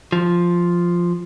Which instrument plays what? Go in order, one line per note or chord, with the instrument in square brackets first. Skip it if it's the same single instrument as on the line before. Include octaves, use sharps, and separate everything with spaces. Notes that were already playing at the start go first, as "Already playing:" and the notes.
[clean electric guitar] F3